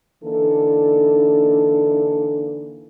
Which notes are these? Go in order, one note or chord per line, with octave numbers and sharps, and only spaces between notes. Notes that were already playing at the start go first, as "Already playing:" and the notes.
D3 E3 A#3 D4 D#4 A4